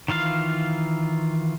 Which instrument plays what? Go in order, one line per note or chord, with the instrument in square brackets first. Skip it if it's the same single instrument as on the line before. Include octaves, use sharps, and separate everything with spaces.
[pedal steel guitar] D#3 E3 F4 F5